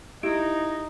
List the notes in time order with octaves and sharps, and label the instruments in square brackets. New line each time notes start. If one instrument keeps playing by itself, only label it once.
[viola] D#4 [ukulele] E4 [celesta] G4 D7